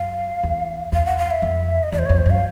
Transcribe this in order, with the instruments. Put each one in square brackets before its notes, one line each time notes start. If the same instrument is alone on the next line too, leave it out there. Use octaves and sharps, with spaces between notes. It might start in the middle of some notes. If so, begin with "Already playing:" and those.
Already playing: [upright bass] F#2 [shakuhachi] F5
[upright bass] E2
[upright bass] E2 [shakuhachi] F5
[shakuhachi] F#5
F5
E5
[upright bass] F2
[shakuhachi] D#5
[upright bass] E2 [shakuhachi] D5
[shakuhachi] C5
[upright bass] F2 [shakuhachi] C#5
[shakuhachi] C5
[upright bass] F#2 [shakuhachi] F5